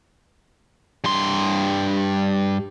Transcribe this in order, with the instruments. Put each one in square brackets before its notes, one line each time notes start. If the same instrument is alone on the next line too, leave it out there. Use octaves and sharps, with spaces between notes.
[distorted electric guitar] G2 C6